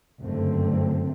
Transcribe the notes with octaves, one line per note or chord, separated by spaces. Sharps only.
F#1 G2 D3 A3 C4